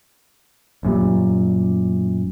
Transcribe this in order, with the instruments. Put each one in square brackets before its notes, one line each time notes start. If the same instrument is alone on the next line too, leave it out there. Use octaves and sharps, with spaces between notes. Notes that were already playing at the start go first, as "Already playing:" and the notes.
[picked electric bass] A1 F#2 A#2 G3